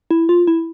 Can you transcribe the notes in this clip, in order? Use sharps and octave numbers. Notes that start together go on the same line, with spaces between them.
E4
F4
E4